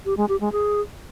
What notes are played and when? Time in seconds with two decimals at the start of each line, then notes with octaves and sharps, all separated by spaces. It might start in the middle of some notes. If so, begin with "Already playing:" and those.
0.05 G4
0.17 G#3
0.29 G4
0.41 G#3
0.52 G#4